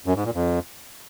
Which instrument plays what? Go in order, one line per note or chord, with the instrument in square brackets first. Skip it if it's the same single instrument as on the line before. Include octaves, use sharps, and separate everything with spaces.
[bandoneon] F#2
G#2
A#2
F2